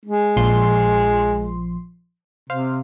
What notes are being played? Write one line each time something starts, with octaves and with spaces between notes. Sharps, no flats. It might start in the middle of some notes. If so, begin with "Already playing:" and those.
G#3
A#1 F3 C6
C3 C5 F5